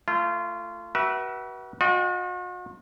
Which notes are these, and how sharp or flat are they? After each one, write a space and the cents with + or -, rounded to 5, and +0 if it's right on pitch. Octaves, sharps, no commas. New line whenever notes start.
A3 +10 F4 -25
F#4 +30 B4 -30 E5 +0
F#4 -45 D#5 +0 G5 +0